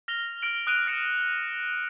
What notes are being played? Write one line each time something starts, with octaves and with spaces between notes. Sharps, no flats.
F6 A#6 F7 G7
F6 A#6 D7 F#7
D#6 F#6 D7 D#7 F7
F6 A#6 C#7 D7 E7